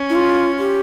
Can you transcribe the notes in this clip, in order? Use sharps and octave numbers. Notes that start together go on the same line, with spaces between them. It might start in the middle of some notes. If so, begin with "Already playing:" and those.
Already playing: C#4
E4
F4
G4